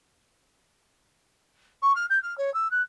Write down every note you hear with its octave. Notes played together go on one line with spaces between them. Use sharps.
C#6
F6
G6
F6
C#5
E6
F#6